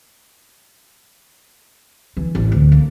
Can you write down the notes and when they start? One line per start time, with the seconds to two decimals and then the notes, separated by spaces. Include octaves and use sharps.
2.17 E3
2.35 A1
2.52 D2
2.72 A#3